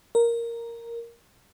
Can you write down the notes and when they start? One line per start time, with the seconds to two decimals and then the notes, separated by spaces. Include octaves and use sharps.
0.15 A#4